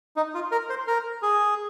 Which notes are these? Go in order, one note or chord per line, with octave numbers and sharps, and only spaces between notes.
D#4
F4
A#4
C5
A#4
G#4